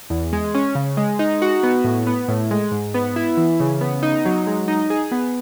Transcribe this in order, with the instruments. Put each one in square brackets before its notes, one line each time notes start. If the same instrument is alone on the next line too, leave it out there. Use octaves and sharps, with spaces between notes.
[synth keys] E2
G#3
C#4
C#3
G#3
D#4
F#4
B3
A2
B3
A2
G#3
G#2
B3
E4
E3
C#3
B3
D#4
F#3
G#3
D#4
G#4
B3